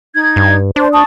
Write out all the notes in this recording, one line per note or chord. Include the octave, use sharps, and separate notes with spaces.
D#4 G#6
G2
D4 C5 D5
A5 C#6 D#6